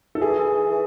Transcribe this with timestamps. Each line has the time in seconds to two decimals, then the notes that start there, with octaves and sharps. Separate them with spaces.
0.15 A4
0.21 E3 G#4
0.70 E3